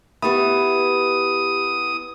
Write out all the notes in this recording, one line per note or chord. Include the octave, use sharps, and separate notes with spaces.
B3 E4 G4 E5 B5 D#6